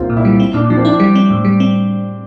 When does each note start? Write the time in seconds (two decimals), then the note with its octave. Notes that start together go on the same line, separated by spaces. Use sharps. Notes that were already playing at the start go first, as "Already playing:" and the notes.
Already playing: C2 A#3 C4 F4
0.10 A#2
0.17 E4
0.25 G3
0.40 C4
0.54 A#2 D4
0.70 F3 D4
0.78 C4
0.85 D4 E4
1.00 G3
1.15 C4
1.30 A2
1.45 G3
1.60 C4